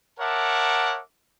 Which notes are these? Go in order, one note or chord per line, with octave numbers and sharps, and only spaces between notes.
A#4 C#5 E5 F#5 A5 D6